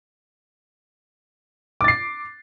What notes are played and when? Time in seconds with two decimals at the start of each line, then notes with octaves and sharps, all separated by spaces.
1.81 D6
1.84 A6
1.88 C7